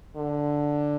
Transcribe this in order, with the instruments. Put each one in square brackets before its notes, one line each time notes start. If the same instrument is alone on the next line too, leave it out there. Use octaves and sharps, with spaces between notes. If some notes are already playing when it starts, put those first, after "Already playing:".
[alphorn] D3